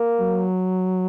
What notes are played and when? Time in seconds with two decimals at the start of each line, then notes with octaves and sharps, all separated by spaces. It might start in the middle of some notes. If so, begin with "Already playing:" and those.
Already playing: A#3
0.21 F#3